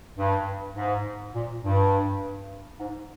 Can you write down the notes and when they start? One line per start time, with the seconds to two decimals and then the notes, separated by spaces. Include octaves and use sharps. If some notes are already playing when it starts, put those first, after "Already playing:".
0.17 G2
0.76 G#2
1.34 A#2
1.63 G2
2.80 G#2